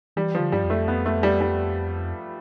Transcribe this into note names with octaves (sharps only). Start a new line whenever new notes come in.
E3 G3
F3
D3
G2 G3
F2
A3
B3
A3
G3
G3